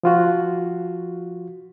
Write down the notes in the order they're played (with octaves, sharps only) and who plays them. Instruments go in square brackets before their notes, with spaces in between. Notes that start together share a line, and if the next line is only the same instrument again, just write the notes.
[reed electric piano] F3 F4 F#4